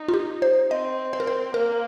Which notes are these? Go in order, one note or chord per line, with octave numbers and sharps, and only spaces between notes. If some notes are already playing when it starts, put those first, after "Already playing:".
Already playing: D#4
F4
G4
C5
C4 D#5
C5
A#4
C5
A#3 A#4